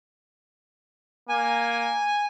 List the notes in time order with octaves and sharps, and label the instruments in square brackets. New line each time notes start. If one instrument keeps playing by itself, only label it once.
[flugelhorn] A#3 [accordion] G#5